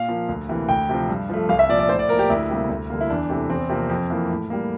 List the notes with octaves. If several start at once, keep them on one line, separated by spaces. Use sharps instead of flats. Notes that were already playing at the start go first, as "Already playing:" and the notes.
Already playing: A#2 F5
F3 A#3
D2
C3 E3 A#3
D2 G5
C3 F3
G2
F3 A3
C2 F5
E5
A#2 F3 D5
D5
A2 C5
D5
F3 A#3 A#4
G4
D2 E4
C3 G3 A#3
D2
D3 G3 A#3
E4
E2 D4
C3 E3 A3
E2 C4
C3 F3 A#3
F2
E3 A#3
A2
G3 A#3